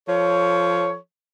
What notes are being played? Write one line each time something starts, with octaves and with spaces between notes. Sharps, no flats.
F3 A4 C#5